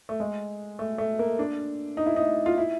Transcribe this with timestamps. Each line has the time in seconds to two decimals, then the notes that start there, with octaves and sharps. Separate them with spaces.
0.09 A3
0.20 G#3
0.79 A3
0.98 A3
1.19 A#3
1.39 D4
1.97 D#4
2.06 E4
2.16 D#4
2.46 F4
2.58 E4